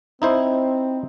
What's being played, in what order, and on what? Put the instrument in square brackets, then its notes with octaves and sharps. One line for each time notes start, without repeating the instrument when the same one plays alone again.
[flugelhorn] C4 [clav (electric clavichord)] D#4 E4 C5